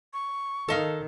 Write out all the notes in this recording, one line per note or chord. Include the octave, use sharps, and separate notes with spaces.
C#6
D#3 A4 D#5 F5